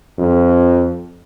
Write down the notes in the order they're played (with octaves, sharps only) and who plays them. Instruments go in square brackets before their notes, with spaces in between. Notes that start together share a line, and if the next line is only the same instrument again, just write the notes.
[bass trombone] F2